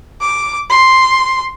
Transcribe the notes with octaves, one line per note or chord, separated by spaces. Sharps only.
D6
C6